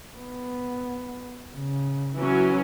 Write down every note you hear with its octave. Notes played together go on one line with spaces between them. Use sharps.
B3
C#3
E3 F#3 C#4